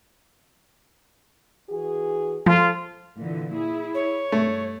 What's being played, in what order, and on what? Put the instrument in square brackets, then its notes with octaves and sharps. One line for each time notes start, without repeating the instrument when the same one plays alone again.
[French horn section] E3 F#4 G#4
[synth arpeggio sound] F3 [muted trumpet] F4 [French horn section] A4 C5
[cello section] A#2 D3 E3
E4 G#4
[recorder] C#5
[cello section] G2 [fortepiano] A3